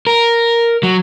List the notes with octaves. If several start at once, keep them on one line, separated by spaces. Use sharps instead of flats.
A#4
F#3